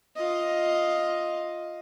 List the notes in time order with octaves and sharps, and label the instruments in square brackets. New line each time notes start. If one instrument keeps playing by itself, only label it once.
[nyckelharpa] F4 D#5